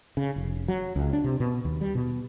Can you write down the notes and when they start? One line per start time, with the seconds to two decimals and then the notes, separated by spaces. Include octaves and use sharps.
0.17 C#3
0.36 F1
0.68 F#3
0.96 C#2
1.13 D4
1.24 C3
1.40 B2
1.65 D#2
1.81 G3
1.95 B2